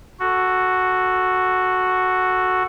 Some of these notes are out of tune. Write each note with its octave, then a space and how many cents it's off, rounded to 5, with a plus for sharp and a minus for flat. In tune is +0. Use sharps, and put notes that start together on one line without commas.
F#4 +0 A4 +10